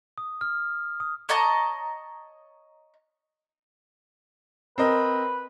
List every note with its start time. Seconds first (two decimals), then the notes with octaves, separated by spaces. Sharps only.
0.18 D#6
0.41 F6
1.00 D#6
1.29 C#5 D#5 A5 A#5
4.78 C4 A#4 B4 D#5